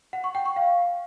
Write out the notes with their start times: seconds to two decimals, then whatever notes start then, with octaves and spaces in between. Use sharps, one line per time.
0.13 F#5
0.24 C#6
0.35 G5
0.46 C#6
0.56 F5